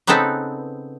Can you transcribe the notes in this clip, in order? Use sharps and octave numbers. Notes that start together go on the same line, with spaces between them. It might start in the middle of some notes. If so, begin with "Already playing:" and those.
C#3 B3 C4 D#4 A4 B4